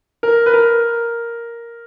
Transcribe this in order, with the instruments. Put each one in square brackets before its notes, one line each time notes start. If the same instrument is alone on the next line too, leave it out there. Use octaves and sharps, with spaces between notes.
[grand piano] A#4
B4
A#4